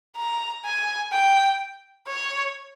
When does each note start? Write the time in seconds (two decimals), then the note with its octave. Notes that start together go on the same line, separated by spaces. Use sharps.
0.17 A#5
0.65 G#5
1.12 G5
2.07 C#5